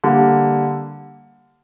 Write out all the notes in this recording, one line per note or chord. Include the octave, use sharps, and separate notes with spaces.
D3 G3 A#3